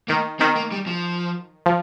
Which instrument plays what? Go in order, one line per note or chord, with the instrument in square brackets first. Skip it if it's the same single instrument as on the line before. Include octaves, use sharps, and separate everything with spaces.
[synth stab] D#3 [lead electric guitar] A#3
[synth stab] D#3 [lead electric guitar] C4
[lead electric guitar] A#3
G3
F3
[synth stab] F3